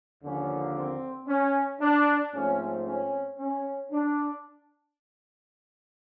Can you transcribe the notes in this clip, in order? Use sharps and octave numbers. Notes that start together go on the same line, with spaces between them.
D#2 D3 F3 A#3 C#4
C4
C#4
D4
G#2 F3 A3 C4 C#4
C#4
C#4
D4